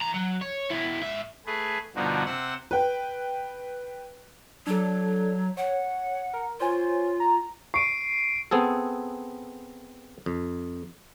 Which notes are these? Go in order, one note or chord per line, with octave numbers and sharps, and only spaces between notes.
E3 A#5
F#3
C#5
B2 E4
G#2 E5
A3 G#4 B4
G2 B2 D3 F3 D#4 F#4
C3 C5 F#5 E6
B4 G5
F#3 D4 A4
C#5 F#5
A#4
F4 C5 C#5 G#5
A#5
C#6 C7 D7 D#7
B3 C4 G#4 A4
F2